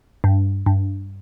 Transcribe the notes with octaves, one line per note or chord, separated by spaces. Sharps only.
G2
G2